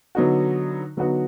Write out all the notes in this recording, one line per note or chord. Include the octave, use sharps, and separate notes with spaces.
D3 F#3 B3 D#4 F#4
D3 F#3 B3 D#4 F#4